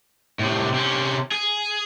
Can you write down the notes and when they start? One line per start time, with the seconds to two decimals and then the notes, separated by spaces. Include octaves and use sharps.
0.39 A2 C3
0.74 C3 C#4
1.32 G#4